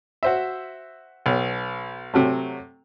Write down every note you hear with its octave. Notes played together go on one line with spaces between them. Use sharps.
F#4 C5 E5
B1
C3 F#3 A3